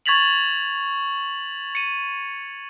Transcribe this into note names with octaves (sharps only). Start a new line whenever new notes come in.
C#6 G#6 A6 B6 F7 F#7
C#7 D#7